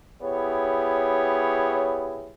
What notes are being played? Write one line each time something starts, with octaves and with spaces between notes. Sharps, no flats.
B3 E4 G4 G#4 C#5